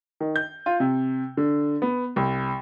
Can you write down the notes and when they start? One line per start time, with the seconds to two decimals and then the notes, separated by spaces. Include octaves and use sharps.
0.20 D#3
0.36 G6
0.66 F4
0.80 C3
1.37 D3
1.82 B3
2.16 C2